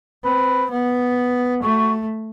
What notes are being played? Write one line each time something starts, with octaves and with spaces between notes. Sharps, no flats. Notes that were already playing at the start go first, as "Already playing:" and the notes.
C4 B4
B3
A3 F#4